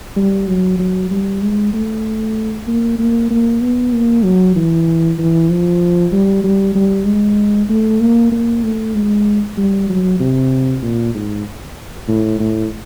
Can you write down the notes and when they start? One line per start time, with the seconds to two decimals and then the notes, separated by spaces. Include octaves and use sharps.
0.16 G3
0.48 F#3
0.79 F#3
1.11 G3
1.42 G#3
1.74 A3
2.67 A#3
2.99 A#3
3.31 A#3
3.61 B3
3.93 A#3
4.24 F#3
4.56 E3
5.18 E3
5.50 F3
6.12 G3
6.44 G3
6.75 G3
7.07 G#3
7.70 A3
8.01 A#3
8.32 A#3
8.64 A3
8.95 G#3
9.57 G3
9.90 F#3
10.20 C3
10.83 A#2
11.15 G#2
12.08 A2
12.40 A2